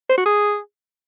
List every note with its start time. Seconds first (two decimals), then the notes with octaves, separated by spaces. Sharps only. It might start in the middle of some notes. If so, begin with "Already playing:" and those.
0.09 C5
0.18 F#4
0.26 G#4